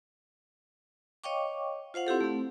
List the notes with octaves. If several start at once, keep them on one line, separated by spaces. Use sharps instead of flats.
C#5 D#5 F5 G5 C#6 D6
F4 C5 F5 F#5
C4 E4 G4 A4
A3 C4